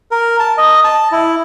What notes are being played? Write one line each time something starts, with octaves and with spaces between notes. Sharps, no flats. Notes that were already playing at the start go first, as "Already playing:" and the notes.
A#4
A5
D#5
A5
E4